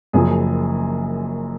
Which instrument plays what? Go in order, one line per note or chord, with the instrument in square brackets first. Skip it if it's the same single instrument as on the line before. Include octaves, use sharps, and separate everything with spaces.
[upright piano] F#1 F#2 F3 G#4